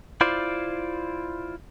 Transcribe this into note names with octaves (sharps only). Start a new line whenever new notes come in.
E4 F4 C5 D5